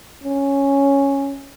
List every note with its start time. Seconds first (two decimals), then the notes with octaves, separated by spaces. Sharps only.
0.24 C#4